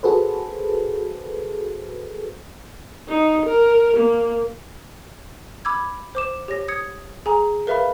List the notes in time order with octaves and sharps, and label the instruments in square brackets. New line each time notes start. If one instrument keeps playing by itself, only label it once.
[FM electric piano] F#4 G#4 A4 B4 C5
[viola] D#4
A#4
A#3
[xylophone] B5 D6 E6 G#6
C5 D6 E7
G4 C#5 A#6
D#6 G#6 C#7
G#4 G#5 A#5
A#4 B4 E5 F5 B5